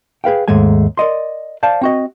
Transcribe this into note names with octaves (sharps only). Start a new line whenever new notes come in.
G#4 B4 F5 G5
D#2 G#2 G#3 A3 G#5
A#4 D5 D#5 C6
C5 D5 F5 A5
C4 F#4 D#5